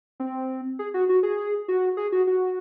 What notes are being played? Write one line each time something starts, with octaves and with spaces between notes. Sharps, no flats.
C4
G#4
F#4
F#4
G#4
F#4
G#4
F#4
F#4